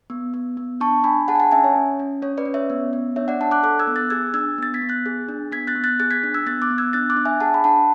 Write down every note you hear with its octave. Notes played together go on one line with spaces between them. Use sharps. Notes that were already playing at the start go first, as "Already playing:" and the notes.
B3
B3
B3
D4 A5 C#6
D4 G#5 B5
G#4 F#5 A5
G#5
F#5 A5
C#4 E5 G#5
C#5
C#4
C#4
C#4 C#5
B4 D5
C#4
C#5 E5
B3
B3
D4 C#5 E5
D5 F#5
D4 F#5 A5
D6 F#6
A4 D6 F#6
E6 G#6
B3
F#6 A6
G#4 E6 G#6
D4 E6 G#6
B3 A6
G#6 B6
B3
F#6 A6
G#4
D4
B3 G#6 B6
F#6 A6
B3
F#6 A6
G#4 F#6 A6
G#6 B6
D4
E6 G#6
B3 F#6 A6
D6 F#6
B3
E6 G#6
D4 F#6 A6
D6 F#6
D4
E5 G#5
G#4 F#5 A5
B5
D4 F#5 A5